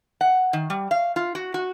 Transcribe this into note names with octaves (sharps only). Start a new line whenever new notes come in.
F#5
D#3
G3
F5
F4
F#4
F#4